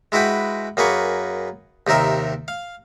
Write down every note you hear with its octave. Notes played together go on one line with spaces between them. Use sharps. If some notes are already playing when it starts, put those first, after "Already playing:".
G#3 E4 F#4 B4 G5
F#2 A#3 G#4 B4 C#6
D#2 C3 D#4 A#4 E5
F5